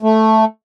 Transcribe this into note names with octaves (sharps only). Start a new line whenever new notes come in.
A3